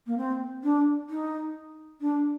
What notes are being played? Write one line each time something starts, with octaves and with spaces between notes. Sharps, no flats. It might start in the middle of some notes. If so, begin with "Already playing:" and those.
A#3
C4
D4
D#4
D4